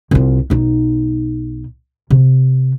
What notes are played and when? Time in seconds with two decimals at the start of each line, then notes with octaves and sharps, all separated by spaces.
0.11 C2 F4
0.50 B1 D#4
2.10 C3